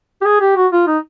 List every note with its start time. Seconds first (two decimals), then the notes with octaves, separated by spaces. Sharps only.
0.22 G4
0.25 G#4
0.41 G4
0.56 F#4
0.72 F4
0.87 D#4